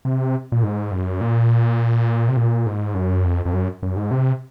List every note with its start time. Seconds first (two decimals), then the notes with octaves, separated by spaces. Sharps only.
0.05 C3
0.52 A#2
0.63 G#2
0.91 F#2
1.21 A#2
2.28 C3
2.37 A#2
2.66 G#2
2.95 F#2
3.24 F2
3.45 F2
3.53 F#2
3.83 F#2
3.97 G#2
4.11 C3